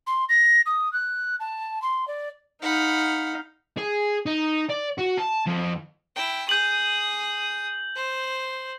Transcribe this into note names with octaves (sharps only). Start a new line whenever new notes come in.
C6
A#6
D#6
F#6
A5
C6
D5
D#4 F5 F#5 B5
G#4
D#4
D5
F#4
A5
F2
E4 G5
G#4 D#6 G6 F#7
C5